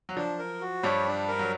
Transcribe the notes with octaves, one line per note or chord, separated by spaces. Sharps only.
F#3
F3 D4
A#4
F#4
G2 G3 C#5
D4
A#4
F#3